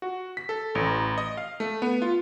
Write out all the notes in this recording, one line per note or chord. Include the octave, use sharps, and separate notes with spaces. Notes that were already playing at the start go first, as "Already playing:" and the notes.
F#4
B6
A4
A1
D#5
F5
A3
B3
F4